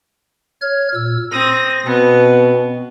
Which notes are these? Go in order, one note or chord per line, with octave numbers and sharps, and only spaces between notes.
C#5 F6 G#6
A#2 E6
C4 D#6 A#6
B2 B3 C4